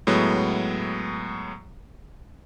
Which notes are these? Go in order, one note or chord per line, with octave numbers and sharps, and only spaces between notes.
A2 F#3 G#3 B3